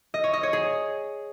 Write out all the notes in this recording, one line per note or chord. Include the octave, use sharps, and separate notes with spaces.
D#5
C#5
D#5
C#5
G#4